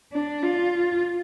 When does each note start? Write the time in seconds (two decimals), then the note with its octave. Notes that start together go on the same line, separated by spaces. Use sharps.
0.12 D4
0.43 F4